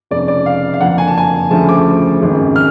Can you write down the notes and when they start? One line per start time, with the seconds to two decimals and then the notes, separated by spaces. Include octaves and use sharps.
0.11 F1 F2 C#3 D5
0.28 D5
0.46 F5
0.74 F5
0.81 F#1 F2 D3 F#5
0.98 G#5
1.08 A5
1.18 G#5
1.51 D2 C#3 F3 A3 A5
1.69 D6
2.21 G#1 F#2 C#3
2.56 F6